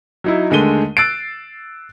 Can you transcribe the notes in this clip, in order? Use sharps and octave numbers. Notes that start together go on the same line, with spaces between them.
F#3 D#4 E4
D#2 D3 G#3 A3 D#7 G7
E6 F#6 A6 C7 D7